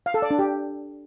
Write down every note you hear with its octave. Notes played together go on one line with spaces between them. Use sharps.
F5
A4
D5
D4
G4